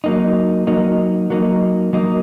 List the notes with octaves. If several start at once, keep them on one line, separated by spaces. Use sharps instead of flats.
F#3 A#3 D#4
F#3 A#3 D#4
F#3 A#3 D#4
F#3 A#3 D#4